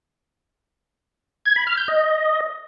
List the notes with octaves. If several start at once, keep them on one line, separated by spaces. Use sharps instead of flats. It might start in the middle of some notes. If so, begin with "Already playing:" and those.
G#6
B5
F6
G6
D#5